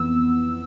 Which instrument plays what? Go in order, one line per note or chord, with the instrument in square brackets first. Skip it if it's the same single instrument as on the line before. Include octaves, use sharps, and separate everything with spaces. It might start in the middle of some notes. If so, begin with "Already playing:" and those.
Already playing: [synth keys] F2 E3 B3 E6